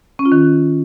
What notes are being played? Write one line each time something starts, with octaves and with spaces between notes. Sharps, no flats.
C#4
F4
D#3